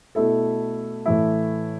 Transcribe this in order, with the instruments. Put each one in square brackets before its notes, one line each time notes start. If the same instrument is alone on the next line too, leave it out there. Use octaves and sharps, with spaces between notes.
[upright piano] B2 A3 E4 A4
A2 E3 A3 E4